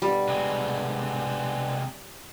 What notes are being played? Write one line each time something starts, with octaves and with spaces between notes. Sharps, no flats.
B2 D3 G3
C3 G#3